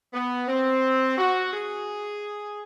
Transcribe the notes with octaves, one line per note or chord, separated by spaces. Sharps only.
B3
C4
F#4
G#4